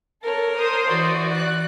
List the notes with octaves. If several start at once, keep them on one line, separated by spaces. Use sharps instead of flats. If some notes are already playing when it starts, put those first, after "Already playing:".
A4 A#4 C#5
C5 D#6
E3 F#4 D5
F#6